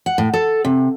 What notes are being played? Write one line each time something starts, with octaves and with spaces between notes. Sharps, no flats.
F#5
A2
A4
C3